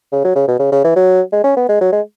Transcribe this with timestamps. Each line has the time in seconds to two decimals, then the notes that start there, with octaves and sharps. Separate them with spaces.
0.12 C#3
0.24 F#3
0.35 C#3
0.48 B2
0.59 C#3
0.72 C#3
0.84 E3
0.96 F#3
1.32 G#3
1.44 C#4
1.56 B3
1.69 G#3
1.81 F#3
1.92 G#3